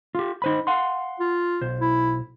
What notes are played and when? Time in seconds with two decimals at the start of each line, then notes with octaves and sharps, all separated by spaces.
0.15 F4 G4
0.42 D#4 C5 B5
0.67 F5 F#5 C6
1.20 F4
1.61 B1 C5
1.80 E4